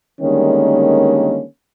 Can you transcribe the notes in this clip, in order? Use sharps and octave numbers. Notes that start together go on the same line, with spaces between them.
D3 D#3 G3 G#3 A#3 C#4